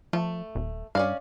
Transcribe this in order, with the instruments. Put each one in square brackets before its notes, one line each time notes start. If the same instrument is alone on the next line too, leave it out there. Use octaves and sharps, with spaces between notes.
[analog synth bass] F3 [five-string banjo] A3
[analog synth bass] D#1
[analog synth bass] G2 [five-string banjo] C#4 D5 F5